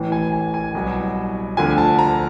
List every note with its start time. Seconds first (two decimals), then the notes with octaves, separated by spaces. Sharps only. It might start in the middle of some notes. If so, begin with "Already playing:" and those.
Already playing: A1 A2 E3
0.12 G#5
0.33 G#5
0.54 G#5
0.74 C2 B2 F#3
1.57 D2 D3 F3 G#5
1.78 A5
1.99 A#5